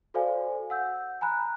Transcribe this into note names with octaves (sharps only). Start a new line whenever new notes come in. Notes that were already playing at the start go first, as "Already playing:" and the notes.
F#4 A4 C5 D5 F5 G#5
F#5 E6 G6
G#5 A#5 B5 F#6